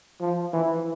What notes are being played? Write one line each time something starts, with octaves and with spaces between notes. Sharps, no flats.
F3
E3